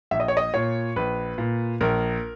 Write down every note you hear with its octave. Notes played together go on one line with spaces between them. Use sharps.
A#1 E5
D#5
C#5
D#5
A#2 C#5
A#1 B4
A#2
A#1 A#4